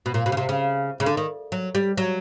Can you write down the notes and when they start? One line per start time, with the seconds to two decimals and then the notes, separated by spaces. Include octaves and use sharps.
0.06 B2
0.14 A#2
0.26 B2
0.32 C#3
0.37 C3
0.49 C#3
1.00 C#3
1.06 D3
1.17 D#3
1.52 F#3
1.75 G3
1.98 F#3